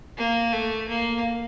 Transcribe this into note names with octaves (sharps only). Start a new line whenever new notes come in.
A#3
A3
A#3